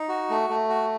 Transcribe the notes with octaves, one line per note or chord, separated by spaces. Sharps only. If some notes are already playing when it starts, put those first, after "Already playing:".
Already playing: D#4
F#4
A3
A3
F#4